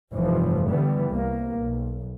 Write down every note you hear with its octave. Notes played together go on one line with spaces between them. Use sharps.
F1 G2 E3 F3
D3 E3 G3 B3
C2 A#3
B1